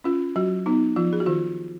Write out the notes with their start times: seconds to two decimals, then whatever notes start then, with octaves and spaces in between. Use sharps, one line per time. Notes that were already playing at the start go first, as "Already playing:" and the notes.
0.04 C#4 F4
0.36 F#3 F#4
0.66 B3 D#4
0.96 F3 F4
1.13 G#4
1.20 F#4
1.26 D#3 F4